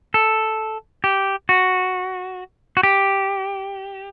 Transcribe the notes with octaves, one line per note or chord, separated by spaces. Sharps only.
A4
G4
F#4
F#4
G4